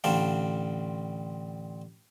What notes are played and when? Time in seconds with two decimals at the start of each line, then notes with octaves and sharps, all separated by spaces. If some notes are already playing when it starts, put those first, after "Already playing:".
0.04 A1 D3 C4 D4 F5